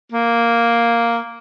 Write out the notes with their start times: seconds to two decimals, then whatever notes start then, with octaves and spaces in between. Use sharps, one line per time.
0.12 A#3